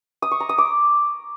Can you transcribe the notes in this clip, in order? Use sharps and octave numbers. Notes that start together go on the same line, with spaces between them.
D#6
C#6
A#5
D#6
D6